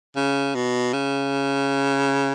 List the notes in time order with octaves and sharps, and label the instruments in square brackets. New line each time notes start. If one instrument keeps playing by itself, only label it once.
[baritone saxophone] C#3
B2
C#3